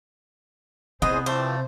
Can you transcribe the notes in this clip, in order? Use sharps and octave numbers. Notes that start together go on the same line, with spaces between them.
E2 C3 B3 G#4 C5 D#5
E3 F3 G3 A3 C4 C5